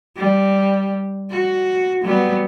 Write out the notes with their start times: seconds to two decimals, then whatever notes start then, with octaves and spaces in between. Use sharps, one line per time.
0.17 G3
1.31 F#4
2.03 F#3 G3 B3